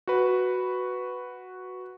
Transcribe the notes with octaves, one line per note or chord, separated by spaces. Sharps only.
F#4 B4